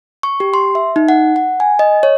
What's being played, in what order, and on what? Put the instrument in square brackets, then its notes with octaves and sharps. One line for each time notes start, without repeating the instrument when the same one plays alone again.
[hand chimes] C#6
G4
C6
E5
D#4
F#5
F#5
G#5
D#5
C#5